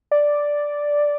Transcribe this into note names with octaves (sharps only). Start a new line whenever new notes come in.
D5